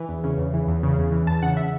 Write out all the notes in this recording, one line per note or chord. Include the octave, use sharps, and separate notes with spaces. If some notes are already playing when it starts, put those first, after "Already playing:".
Already playing: E3
E2
C#3
E2
E3
E2
C#3
E2
E3
E2 A5
C#3 F#5
E5